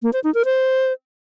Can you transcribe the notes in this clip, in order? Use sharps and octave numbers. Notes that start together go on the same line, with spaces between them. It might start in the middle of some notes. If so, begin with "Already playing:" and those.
A#3
C5
D#4
A#4
C5